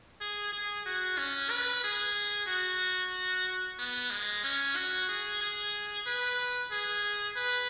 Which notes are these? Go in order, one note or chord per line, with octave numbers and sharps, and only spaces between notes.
G#4
G#4
F#4
C#4
B4
G#4
F#4
B3
G#3
C#4
F#4
G#4
G#4
B4
G#4
B4